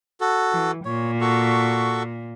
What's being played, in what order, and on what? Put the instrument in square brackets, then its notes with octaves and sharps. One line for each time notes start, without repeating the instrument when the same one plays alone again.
[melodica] F#4 A4
[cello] E3
[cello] A#2 [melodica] C#5
[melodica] F#4 A4 C#6